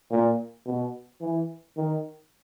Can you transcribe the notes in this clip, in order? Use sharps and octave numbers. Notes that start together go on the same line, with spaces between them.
A#2
B2
E3
D#3